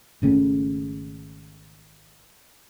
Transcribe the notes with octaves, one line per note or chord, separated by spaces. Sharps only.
G#1 C#3 A3 C#4